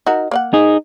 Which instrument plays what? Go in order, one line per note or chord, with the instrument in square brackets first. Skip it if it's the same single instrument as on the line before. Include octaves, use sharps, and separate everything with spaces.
[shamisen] D#4 F#4 A#4
A#3 D5 F#5
[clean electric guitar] D#4 G#4